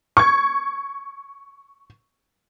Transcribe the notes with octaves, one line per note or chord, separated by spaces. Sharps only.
C#6 G#6